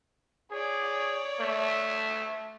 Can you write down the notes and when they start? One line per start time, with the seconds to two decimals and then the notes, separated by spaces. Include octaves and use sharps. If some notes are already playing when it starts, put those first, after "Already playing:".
0.51 G#4 C#5 D5
1.40 A3